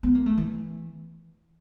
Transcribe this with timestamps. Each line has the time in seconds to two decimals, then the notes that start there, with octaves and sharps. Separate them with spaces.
0.03 B3
0.15 A#3
0.26 A3
0.37 E3